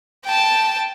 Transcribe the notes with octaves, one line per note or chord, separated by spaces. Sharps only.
G5 A5